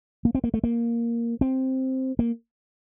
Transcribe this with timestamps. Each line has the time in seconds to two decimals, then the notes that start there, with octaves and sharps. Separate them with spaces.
0.25 A#3
0.35 C4
0.44 A#3
0.54 A3
0.64 A#3
1.41 C4
2.19 A#3